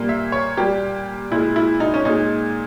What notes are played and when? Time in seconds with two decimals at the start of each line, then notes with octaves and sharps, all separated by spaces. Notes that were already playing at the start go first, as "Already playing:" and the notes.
Already playing: A#2 G3 A#3
0.09 E5
0.32 C#5
0.57 A#2 G3 A#3 G4
1.31 A#2 G#3 E4
1.56 E4
1.80 D#4
1.94 C#4
2.05 A#2 G#3 D#4